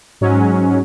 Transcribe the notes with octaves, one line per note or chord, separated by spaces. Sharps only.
G#2 F#3 C#4